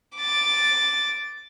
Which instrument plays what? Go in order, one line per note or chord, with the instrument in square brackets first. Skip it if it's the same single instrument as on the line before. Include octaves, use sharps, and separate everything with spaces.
[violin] D6 A6